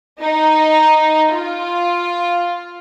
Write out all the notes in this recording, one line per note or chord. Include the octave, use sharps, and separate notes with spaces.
D#4
F4